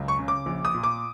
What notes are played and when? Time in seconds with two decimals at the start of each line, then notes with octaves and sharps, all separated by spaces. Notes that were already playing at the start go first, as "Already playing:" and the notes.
Already playing: C#2 F#2
0.08 C#6
0.19 C#3
0.28 D6
0.46 A#1
0.65 D#6
0.74 A#2
0.84 D6